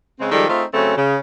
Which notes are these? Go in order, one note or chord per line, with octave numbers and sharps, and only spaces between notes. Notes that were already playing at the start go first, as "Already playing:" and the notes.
C#3 G#3 C4
D#3 F3 G3 G#3 A4
A3 C4 D#4 F4 G#4
C#3 F#3 A3 C4 C#4
C#3